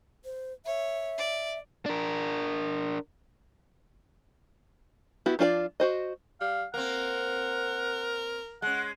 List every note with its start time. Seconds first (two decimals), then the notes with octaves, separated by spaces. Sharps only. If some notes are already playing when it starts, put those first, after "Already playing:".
0.25 C5
0.65 C#5 E5
1.18 D5
1.86 D4 A#4
5.26 B3 E4 F#4 G4
5.39 F3 D4 F4 A4 D5
5.80 F#4 C5 D#5
6.41 G3 F5
6.74 A#3 C4 A#4 F#5
8.62 G#3 C#4 F#5